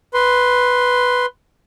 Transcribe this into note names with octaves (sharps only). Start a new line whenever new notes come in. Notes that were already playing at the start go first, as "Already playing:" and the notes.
B4 C6